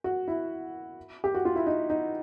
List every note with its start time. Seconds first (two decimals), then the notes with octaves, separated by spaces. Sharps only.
0.04 F#4
0.28 E4
1.24 G4
1.35 F#4
1.45 F4
1.56 E4
1.66 D#4
1.90 D#4